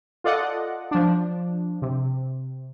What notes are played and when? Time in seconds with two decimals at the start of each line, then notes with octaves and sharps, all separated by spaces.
0.24 F4 A4 D5 D#5 F#5
0.91 F3 D4
1.82 C3